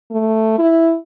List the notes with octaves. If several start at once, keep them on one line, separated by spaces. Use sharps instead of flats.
A3
E4